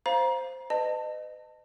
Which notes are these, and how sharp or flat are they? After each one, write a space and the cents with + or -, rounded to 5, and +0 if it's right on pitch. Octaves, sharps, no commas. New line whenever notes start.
C5 +0 F5 +0 A#5 +30
B4 +40 D#5 -25 A5 +20